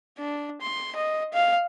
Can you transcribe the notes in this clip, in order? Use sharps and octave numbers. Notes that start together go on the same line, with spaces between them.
D4
C6
D#5
F5